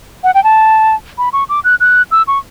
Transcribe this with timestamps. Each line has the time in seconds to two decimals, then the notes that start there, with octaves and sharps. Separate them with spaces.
0.24 F#5
0.34 G5
0.44 A5
1.18 B5
1.33 C#6
1.49 D6
1.64 F#6
1.80 F#6
2.11 E6
2.28 C#6